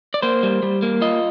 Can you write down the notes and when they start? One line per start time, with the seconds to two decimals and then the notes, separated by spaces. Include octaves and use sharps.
0.14 D5
0.22 A#3 C5
0.43 G3
0.63 G3
0.82 A#3
1.02 F4 D#5